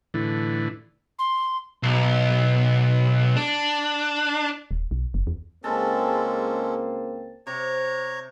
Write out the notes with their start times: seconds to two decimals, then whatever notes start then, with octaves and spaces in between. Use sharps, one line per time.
0.14 A2 D3 E3
1.19 C6
1.83 B1
3.36 D4
4.71 D#1
4.91 B1
5.14 F#1
5.27 E2
5.64 C#2 G#3 A#3 C4 C#4 A4 A5
7.47 C3 C#5 A#5